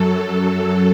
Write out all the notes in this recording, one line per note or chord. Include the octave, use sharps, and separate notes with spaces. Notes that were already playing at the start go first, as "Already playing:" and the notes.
Already playing: F#2 F#3 A4
A4